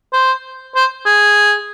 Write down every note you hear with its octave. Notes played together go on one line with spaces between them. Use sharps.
C5
C5
G#4